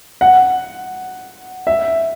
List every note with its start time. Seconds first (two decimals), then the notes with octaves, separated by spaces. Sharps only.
0.21 F#5
1.67 E5